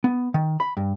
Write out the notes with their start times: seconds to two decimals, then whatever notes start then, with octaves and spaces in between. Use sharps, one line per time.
0.04 B3
0.34 D#3
0.60 B5
0.77 G2